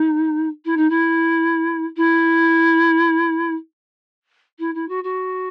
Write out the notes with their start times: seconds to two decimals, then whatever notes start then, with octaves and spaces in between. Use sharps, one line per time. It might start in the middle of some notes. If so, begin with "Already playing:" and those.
Already playing: D#4
0.65 E4
0.77 D#4
0.90 E4
1.97 E4
4.59 E4
4.75 E4
4.89 F#4
5.04 F#4